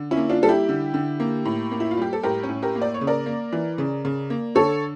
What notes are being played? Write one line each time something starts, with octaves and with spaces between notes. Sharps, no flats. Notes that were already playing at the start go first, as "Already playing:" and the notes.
Already playing: D3
C#4 E4
A#3
D4 F4
G3 A4
E4 G4
D3
D3
A#3
A2
A#3
E4
F4
G3 G4
A4
A2 G4 A#4
C#4
A2
G4 A#4
A#3
D5
C#5
C#3
A#4 D5
A#3
E3
C#3
C#3
A#3
D3 A4 C#5